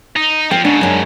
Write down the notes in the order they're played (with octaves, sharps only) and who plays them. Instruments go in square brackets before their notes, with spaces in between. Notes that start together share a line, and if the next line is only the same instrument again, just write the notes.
[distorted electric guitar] D#4
[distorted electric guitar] F3 C4 [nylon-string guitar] G5
[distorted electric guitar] G#2 C#3 [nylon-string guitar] D4
[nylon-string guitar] F#2 D4